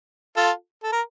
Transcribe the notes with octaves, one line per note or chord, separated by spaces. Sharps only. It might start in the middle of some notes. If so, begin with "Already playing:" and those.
F4 A4
A4
A#4